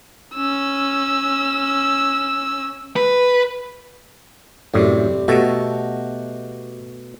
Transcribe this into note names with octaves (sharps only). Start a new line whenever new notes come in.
C#4 E6
B4
F#2 A2 C3 G3
B2 A3 F#4 G4 A4 A#5